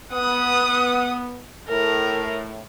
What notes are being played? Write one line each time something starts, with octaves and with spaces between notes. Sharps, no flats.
B3 F#5 D#6
A2 A#4